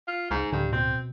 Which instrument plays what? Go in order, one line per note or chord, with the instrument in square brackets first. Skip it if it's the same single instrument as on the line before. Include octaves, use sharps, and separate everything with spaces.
[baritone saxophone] F4
[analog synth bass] C#2 [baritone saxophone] G#2
[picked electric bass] D1 [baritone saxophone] G2 [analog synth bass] D3
[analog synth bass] B2 [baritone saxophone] C4